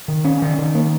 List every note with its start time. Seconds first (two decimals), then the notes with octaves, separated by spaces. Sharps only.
0.08 D#3
0.25 C#4
0.42 D#3
0.58 D#3
0.75 A#3